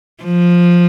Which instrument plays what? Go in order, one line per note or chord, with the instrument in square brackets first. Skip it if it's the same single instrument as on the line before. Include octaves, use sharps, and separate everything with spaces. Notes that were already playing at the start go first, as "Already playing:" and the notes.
[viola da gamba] F3